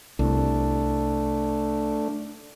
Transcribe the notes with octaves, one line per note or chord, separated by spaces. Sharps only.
C2 A3 D4